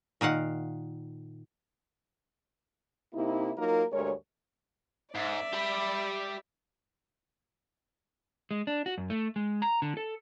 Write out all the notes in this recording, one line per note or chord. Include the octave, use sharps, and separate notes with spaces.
A#2 D#3 F5 F#5
C3 A#3 D#4 E4
F#3 A#3 D#4 F4 A#4
D2 G2 G#3 A#4 C#5
G#2 D5 E5
G4 B5
G#3
D4
F#4
F#2
A3
G#3
A#5
D3
A4